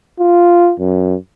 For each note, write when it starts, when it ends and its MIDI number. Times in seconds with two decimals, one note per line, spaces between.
0.20 0.73 65
0.80 1.16 42